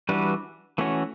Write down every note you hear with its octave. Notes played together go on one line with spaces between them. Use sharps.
E3 G3 D4 F#4 B4
E3 A3 C#4 F#4